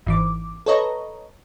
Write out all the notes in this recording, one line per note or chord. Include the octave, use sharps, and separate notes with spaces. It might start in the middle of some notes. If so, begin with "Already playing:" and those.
G#1 E3 D6
A4 B4 C#5 D#5 A#5